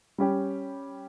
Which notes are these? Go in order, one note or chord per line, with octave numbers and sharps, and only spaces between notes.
G3 C#4 G4